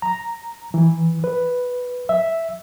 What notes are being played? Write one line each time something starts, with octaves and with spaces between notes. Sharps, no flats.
A#5
E3
B4
E5